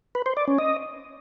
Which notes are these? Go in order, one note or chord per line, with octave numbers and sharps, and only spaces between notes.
B4
C5
D5
C#4
D#5